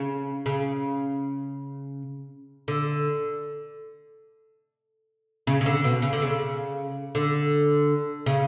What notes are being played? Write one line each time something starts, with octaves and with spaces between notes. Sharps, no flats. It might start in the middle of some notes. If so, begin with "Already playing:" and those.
Already playing: C#3
C#3
D3
C#3
C#3
D3
B2
C#3
D3
C#3
D3
C#3